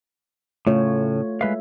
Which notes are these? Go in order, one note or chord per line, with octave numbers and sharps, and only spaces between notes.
A2 C#3 A3 F4 C#5
G#3 B4 E5 F5